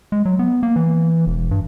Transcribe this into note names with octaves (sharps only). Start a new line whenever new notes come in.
G#3
F#3
B3
A#3
E3
E1
G2